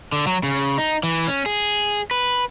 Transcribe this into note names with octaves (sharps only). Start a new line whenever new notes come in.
D3
F#3
C#3
D#4
E3
C#4
G#4
B4